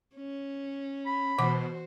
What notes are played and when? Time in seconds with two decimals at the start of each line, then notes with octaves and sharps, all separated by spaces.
0.16 C#4
1.06 B5
1.38 B2 E3 F#4 C5 F#5 D6